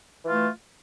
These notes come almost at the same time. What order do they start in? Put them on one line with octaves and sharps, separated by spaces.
E3 F4 A3